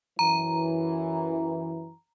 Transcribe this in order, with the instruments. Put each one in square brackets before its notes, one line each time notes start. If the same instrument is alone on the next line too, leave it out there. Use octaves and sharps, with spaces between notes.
[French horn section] F#2 E3 [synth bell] A#5